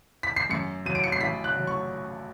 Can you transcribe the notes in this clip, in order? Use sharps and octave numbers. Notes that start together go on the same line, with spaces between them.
B6
C7
F#2 C#7
F#3 D#7
D7
C#7
C7
A1 B6
F#6
F#3
C#6